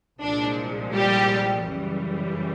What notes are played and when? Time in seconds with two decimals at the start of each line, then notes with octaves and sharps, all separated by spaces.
0.21 C2 A#2 F3 G#3 D4
0.93 G3 G4
1.64 F#2 C#3 E3 G3